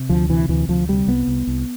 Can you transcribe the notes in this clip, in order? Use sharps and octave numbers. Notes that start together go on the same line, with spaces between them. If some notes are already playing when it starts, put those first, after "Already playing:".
Already playing: C3
D2 F3
C3 E3
D2 E3
D2 F3
C3 G3
C2 B3
C2
C2